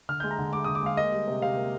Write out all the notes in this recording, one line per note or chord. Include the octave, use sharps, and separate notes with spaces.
D3 F6
G6
G#3
A#5
D3
G#3 D6
D#6
D3
D6
G#3 F5
A#3 D#5
G3
C3
C3 F5
A#3